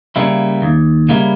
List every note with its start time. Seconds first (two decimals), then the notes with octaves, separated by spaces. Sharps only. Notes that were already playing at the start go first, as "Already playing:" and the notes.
0.16 C#3 G3 A#3 E4
0.62 D#2
1.09 C#3 G3 A#3 E4